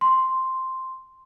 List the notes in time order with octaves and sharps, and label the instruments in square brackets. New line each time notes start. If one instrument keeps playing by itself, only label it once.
[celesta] C6